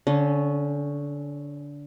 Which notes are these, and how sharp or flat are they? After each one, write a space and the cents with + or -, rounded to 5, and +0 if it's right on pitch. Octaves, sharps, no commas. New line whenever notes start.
D3 -25 C#4 +0